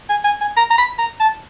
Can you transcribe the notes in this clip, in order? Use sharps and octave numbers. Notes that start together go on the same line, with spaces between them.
G#5
G#5
G#5
A#5
A#5
B5
A#5
A5